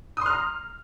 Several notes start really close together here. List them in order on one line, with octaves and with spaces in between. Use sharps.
D#6 C6 F6 A#5